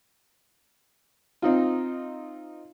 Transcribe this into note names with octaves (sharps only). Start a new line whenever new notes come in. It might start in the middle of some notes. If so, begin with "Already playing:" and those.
C4 D#4 F4